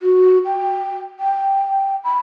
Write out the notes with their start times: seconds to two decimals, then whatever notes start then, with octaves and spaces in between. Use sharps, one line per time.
0.03 F#4
0.45 G5
1.20 G5
2.04 B5